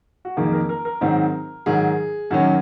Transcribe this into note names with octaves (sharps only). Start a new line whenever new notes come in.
F#4
F2 D#3 A#3 G#4
A#4
A#4
A#4
G#2 D#3 F#3 C4 D#4
G#2 D#3 F#3 G#4
F#2 D#3 F#3 C#4 F#4